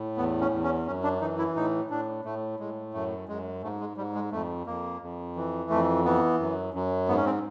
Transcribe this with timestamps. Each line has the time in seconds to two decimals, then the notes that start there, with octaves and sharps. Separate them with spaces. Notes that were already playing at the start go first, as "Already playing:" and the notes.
Already playing: A2
0.17 E2 B3
0.41 C#4
0.52 E2
0.64 C#4
0.86 F#2 C#4
1.04 D4
1.21 E3 D#4
1.38 E4
1.55 A2 D#4
1.90 A2 D4
2.25 A2 A3
2.59 A2 G#3
2.94 F#2 A3
3.28 F#2 G#3
3.63 G#2 A3
3.80 G#3
3.97 G#2 G3
4.15 G#3
4.32 F2 A3
4.67 F2 A#3
5.01 F2
5.36 E3
5.70 F2 A3
6.05 E3 B3
6.40 F#2
6.74 F#2
7.09 G#2 B3
7.17 C#4
7.26 C4